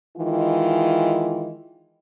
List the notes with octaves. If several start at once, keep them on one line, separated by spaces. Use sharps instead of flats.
D#3 E3 G#3 F4